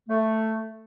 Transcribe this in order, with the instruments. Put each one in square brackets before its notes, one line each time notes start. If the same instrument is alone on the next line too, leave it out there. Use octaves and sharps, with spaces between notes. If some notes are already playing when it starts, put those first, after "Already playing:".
[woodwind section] A3